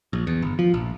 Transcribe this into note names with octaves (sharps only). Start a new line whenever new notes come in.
A#1
E2
G1
F3
A#1